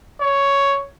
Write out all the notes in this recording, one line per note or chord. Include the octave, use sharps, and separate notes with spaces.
C#5